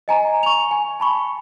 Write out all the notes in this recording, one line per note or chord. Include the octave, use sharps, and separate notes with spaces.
D#5 G#5 A#5
C#6 F7
G#5
A5 B5 C#6